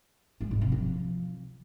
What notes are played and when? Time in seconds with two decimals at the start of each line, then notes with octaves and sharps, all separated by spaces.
0.41 G#3
0.51 G#2
0.61 C3
0.72 F3